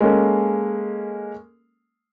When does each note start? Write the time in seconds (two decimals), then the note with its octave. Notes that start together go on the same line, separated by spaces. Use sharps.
0.01 G#3 A#3 C#4 A4